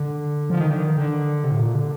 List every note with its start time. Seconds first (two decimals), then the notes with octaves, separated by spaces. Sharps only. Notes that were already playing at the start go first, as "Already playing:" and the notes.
Already playing: D3
0.50 F3
0.61 D#3
0.70 D3
0.80 D#3
0.97 D3
1.44 C3
1.51 A2
1.59 A#2
1.75 D3